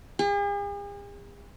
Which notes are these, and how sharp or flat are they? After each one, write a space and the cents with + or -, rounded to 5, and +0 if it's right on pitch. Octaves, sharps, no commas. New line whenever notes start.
G#4 -45